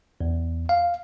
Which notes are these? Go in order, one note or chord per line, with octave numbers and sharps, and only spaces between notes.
E2
F5